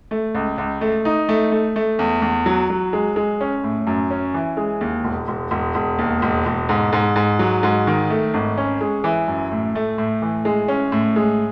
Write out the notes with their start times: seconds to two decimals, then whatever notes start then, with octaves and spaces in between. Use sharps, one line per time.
0.11 A3
0.35 C#2
0.58 C#2
0.81 A3
1.05 D#4
1.29 A3
1.52 A3
1.76 A3
1.99 E2
2.22 E2
2.46 F#3
2.70 F#3
2.93 G#3
3.16 G#3
3.41 C#4
3.64 A2
3.87 F#2
4.10 C#4
4.34 E3
4.57 G#3
4.81 D#2
5.04 E1
5.28 E1
5.51 E1
5.75 E1
5.99 D#2
6.22 E1
6.46 E1
6.69 G#2
6.93 G#2
7.16 G#2
7.39 F#3
7.63 G#2
7.87 D#3
8.10 A3
8.34 G#1
8.58 C#4
8.81 G#3
9.04 E3
9.28 F#2
9.52 A2
9.75 A3
9.98 A2
10.22 E3
10.45 G#3
10.68 C#4
10.92 A2
11.16 G#3